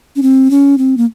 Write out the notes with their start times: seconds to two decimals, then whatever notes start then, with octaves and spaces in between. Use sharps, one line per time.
0.16 C#4
0.22 C4
0.50 C#4
0.78 C4
0.97 A#3